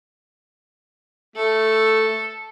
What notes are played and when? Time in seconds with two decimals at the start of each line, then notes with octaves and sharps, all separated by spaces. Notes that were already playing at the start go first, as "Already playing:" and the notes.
1.36 A3 A4